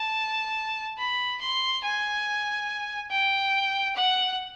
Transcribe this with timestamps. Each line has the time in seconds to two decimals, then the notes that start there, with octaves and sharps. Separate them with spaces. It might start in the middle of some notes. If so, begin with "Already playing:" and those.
Already playing: A5
0.98 B5
1.41 C6
1.84 G#5
3.11 G5
3.96 F#5